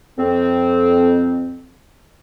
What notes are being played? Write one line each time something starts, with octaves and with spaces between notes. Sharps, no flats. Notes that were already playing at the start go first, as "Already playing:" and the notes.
F2 C4